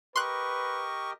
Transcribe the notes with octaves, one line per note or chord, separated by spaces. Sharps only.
G4 A#4 B4 D#5 C6 C#6 F#6